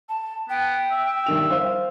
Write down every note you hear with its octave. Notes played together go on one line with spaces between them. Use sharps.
A5
B3 G5
E5
G2 D#3 F7
C5 F5